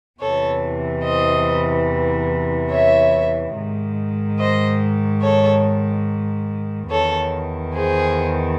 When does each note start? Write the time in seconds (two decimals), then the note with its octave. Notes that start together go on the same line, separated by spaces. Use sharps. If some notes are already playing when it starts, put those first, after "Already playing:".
0.19 E2 C3 E3 A4 C#5
1.03 C5 D#5
2.71 C#5 E5
3.54 G#2 D#3
4.38 C5 D#5
5.22 A4 C#5
6.89 E2 D#3 A4 C#5
7.73 G#4 C5